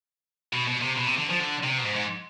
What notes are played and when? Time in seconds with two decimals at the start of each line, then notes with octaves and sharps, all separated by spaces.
0.53 B2
0.67 B2
0.82 C3
0.97 B2
1.07 C3
1.18 D3
1.30 F3
1.40 D3
1.63 C3
1.78 B2
1.84 G#2
1.95 G#2